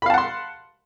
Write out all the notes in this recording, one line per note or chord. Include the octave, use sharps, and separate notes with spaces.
F5 F#5 A5 B5 C6